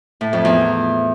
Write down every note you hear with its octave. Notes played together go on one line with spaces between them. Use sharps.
A2
F2
E2